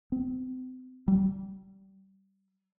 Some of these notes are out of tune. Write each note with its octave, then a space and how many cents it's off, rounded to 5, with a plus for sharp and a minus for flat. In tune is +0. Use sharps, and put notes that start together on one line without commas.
C4 -35
G3 -25